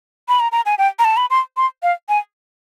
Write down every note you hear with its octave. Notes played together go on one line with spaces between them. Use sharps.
B5
A#5
A#5
G#5
G5
A#5
A5
B5
C6
C6
F5
G#5